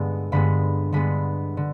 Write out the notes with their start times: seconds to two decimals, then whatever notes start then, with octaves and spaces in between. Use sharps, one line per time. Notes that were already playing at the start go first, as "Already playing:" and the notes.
Already playing: G2 D3 G#3 B3
0.32 G2 D3 G#3 B3 B5
0.92 G2 D3 G#3 B3 B5
1.57 D3